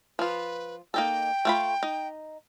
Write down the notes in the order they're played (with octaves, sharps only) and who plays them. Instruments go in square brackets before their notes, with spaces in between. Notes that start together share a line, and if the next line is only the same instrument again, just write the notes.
[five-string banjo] F3 F4 [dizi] B4
[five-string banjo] A#3 D#4 A4 [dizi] G5
[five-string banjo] A3 F4 B5
D#4